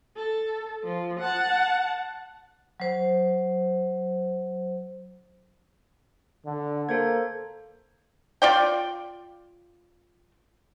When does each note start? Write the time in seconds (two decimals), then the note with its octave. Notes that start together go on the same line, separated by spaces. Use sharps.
0.16 A4
0.84 F3
1.20 F#5 A5
2.80 F#3 C5
6.45 D3
6.89 A#3 A4 C5 G#6
8.42 F4 D5 G5